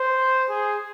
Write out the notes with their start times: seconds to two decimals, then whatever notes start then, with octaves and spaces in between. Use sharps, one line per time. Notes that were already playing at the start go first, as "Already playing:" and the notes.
Already playing: C5
0.49 G#4